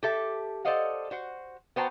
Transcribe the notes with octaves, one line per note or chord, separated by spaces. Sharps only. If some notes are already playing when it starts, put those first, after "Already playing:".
G4 A4 E5
A4 C5 D5 D#5 F5 F#5
F#4 C5 F#5
B3 F#4 C5 G5 A5 A#5